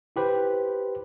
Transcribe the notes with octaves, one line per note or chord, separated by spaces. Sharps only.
E4 G4 B4 C5